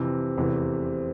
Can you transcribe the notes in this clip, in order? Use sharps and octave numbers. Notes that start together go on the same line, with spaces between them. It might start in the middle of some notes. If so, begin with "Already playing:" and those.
Already playing: F2 C3 E3
F1 E2 C3 E3